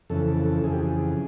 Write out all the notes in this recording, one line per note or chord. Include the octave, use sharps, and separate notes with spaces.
F2 C#3 E3 A4
A4
A4
F2 C#3 E3 G#4
G4
G#4